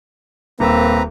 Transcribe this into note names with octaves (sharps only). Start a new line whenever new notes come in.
D#1 A#3 C4 B4 A#5 E6